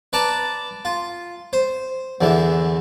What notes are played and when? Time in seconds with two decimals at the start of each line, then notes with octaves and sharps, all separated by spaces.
0.13 B4 D5 A5 A#5
0.85 F4
1.53 C5
2.21 E2 D3 E3